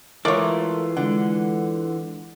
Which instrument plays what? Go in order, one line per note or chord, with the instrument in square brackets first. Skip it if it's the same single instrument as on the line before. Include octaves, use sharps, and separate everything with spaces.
[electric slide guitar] E3 F4 [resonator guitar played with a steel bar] G#3 A3 A#4 [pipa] C#5 D5
[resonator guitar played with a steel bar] D3 [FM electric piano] G#3 D4 F#5